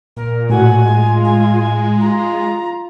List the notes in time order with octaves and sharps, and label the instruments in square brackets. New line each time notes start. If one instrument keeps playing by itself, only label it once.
[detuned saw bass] A#2 [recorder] A#4
[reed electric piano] A2 [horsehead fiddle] F#4 [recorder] G#5
[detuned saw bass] G#3 [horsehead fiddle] F4
[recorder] G#5
[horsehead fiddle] F4 [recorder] A#5